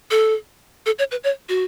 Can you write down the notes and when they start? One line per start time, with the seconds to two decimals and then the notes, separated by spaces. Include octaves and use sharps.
0.11 A4
0.86 A4
0.99 C#5
1.11 B4
1.24 C#5
1.49 F#4